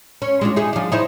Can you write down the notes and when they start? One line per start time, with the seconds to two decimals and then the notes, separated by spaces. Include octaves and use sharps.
0.22 C#4
0.41 G#3 D4 F4
0.56 D#4 E4 G#4
0.73 F3 D4
0.92 D#4 E4 C5